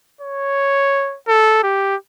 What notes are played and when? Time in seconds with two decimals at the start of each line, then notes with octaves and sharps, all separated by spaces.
0.21 C#5
1.28 A4
1.63 G4